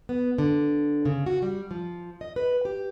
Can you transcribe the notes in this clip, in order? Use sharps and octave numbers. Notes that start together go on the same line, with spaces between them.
B3
D3
C#3
F#4
G3
F3
D#5
B4
G4